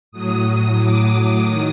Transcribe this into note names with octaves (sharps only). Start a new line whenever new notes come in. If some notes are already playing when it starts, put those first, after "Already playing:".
A2 F#3 D#6
D6
D#3 F#3 D#6